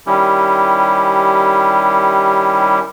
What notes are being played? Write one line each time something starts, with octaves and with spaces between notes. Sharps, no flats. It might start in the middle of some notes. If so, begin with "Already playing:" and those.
D#3 G3 C#4 E4 G4